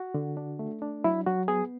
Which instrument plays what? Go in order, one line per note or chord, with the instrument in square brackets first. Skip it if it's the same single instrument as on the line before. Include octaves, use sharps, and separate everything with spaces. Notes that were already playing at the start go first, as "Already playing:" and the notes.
Already playing: [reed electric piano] F#4
D3
D4
A3
D4
F#3 E4
F#3 F#4
B3 G#4